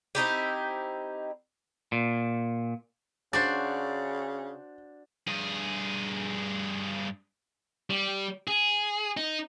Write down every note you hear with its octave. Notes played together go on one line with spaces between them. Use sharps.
C4 D#4 E4 G4
A#2
C#3 D4 F#4 C5 A6
G2 G#4
G3
G#4
D#4